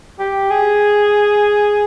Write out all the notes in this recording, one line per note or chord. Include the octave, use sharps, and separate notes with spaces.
G4
G#4